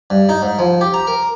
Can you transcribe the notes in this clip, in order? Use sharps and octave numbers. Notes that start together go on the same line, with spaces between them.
G2
D#4
G#2
F3
G4
A#5
A#4